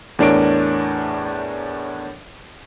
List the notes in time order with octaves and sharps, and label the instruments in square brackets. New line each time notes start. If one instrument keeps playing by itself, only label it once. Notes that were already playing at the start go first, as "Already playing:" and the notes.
[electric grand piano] E2 A2 D4 A#4 C#5 D7